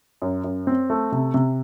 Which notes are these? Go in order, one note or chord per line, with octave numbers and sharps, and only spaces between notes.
F#2
F#2
C4
A3
C3
C3